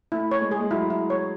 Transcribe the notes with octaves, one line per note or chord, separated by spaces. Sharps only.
A3 E4
C#5
G#3
G#4
G#3
F#3 E4
E4
C#5